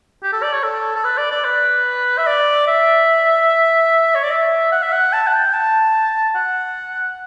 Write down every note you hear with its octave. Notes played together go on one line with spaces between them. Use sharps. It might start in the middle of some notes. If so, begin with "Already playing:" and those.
G4
A4
D5
C#5
A4
A4
B4
D5
D5
B4
E5
D5
E5
C#5
D5
E5
F#5
E5
F#5
A5
F#5
G5
A5
F#5